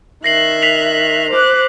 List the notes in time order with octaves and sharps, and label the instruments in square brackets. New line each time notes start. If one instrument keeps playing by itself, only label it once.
[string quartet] D#3 E5 F#6 [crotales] A#6 C7 F#7
[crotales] B6 C7 F7
[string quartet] C5 D6 F#6